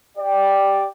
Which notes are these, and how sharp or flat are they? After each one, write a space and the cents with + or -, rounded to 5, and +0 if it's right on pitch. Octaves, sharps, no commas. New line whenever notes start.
G4 +0 D5 +0 G5 +0